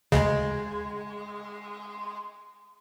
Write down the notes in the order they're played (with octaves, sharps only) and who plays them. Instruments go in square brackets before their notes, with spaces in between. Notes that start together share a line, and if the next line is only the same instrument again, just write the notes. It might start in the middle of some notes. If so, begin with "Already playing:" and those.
[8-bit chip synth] D2 C#3 [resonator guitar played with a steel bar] G#3